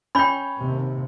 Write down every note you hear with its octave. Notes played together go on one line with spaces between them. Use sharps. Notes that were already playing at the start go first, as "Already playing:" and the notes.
C#4 G5 B5 G6
D#2 C3